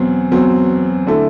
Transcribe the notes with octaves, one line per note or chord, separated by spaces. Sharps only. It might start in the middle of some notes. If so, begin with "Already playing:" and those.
Already playing: E2 B2 F#3 C4
E2 B2 F#3 C4
D3 A3 E4 A4